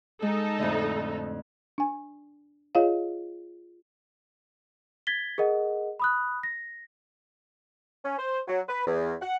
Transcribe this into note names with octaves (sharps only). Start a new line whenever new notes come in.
G#3 D#4 A4
F2 A2 D3
D4 G#5
F4 G#4 C#5 D#5 F5
G#6 A6 B6 G7
G#4 A#4 D#5 F#5
B5 D#6 F#6
A#6
C#4
C5
F#3
B4
E2
F#5